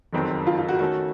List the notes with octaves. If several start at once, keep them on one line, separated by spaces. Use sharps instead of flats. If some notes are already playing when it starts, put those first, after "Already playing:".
F#1 F2 D#3 F#3 C4
F4
F4
F#4
D#3 A3 C#4 F#4 A4